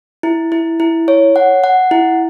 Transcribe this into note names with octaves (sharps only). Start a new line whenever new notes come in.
E4
E4
E4
C#5
F#5
F#5
E4